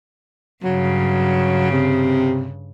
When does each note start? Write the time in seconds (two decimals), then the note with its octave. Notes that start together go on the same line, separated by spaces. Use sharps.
0.64 G2 C#3 F#3
1.72 C3